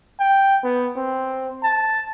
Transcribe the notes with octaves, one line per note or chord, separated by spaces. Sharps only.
G5
B3
C4
A5